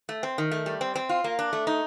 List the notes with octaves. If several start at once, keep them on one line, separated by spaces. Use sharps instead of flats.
A3
C4
D#3
A3
G3
C4
C4
F4
A#3
D4
A3
D#4